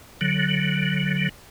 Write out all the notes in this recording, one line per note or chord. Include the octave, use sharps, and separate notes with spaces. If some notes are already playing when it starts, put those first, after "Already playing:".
D3 F#3